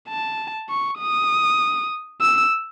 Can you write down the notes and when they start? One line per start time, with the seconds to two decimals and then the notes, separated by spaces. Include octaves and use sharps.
0.09 A5
0.70 C#6
1.00 D#6
2.21 E6